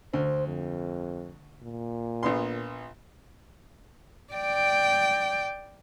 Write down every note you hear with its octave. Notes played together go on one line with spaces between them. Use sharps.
D2 C5
F2
A#2
A#1 B3 C6
D5 G5